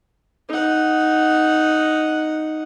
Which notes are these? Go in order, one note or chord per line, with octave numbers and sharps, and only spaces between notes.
D#4 F#5